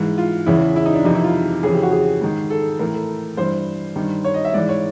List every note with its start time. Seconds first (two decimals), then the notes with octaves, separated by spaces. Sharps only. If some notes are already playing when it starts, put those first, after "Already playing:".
Already playing: G#2 E3
0.18 F4
0.46 E2 C#3 E3 E4
0.76 E4
0.86 D#4
0.95 D4
1.05 F2 C3 E3 D#4
1.15 E4
1.24 F4
1.63 F2 C#3 E3 G#4
1.73 G4
1.82 F#4
1.92 G#4
2.21 G#2 D#3
2.50 A4
2.79 A2 E3 A#4
2.94 A4
3.37 G2 E3 C5
3.96 G2 D#3
4.24 C#5
4.34 D#5
4.45 E5
4.54 G#2 E3 D5
4.69 C#5